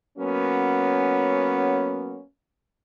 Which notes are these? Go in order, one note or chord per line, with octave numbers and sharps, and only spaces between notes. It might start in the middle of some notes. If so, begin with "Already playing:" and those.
F#3 A#3 B3 C#4